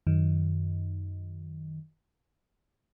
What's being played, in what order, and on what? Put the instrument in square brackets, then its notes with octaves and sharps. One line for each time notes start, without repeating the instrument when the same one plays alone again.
[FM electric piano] F#2 D#3